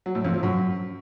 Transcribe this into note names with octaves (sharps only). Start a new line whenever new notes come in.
F#3
A2
F2
F3
F#2